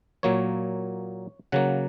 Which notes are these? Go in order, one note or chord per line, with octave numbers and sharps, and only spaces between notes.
A#2 F#3 A#3 C#5
C#3 F#3 A#3 F#5